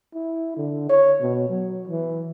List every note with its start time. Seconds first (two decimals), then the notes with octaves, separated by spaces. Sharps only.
0.15 E4
0.56 D3
0.89 C#5
1.21 B2
1.49 F#3
1.87 E3